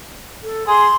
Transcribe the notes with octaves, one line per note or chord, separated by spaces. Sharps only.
A4
G#4 C6